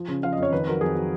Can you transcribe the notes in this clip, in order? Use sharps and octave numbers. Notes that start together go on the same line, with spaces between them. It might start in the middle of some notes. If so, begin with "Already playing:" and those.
Already playing: F3
C#3
F3 F5
D#5
F2 C#5
D#3 B4
F#3 A#4
F2 G#4
F#3